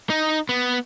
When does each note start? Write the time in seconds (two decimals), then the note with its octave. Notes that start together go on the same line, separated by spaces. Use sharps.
0.10 D#4
0.49 B3